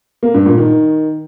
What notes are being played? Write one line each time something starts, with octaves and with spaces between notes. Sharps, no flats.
A#3
G2
A#2
D#3